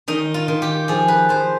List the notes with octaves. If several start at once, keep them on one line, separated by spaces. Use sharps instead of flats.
D#3 D#4
F4
D#3
G4
F3 G#4
B4
F3 C5